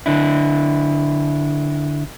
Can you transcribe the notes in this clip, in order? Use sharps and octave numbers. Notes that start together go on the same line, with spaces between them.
D3 D4 E4